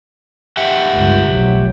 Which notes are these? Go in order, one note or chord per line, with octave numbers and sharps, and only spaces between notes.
G4 E5 F#5
G1 C#2
F1 B1 F#3